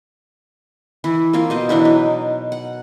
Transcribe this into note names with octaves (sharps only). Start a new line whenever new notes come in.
E3 E4
A#3 C4 F4
B2 C5 D#5
E3 F#3 D4 E4
D#4
F#5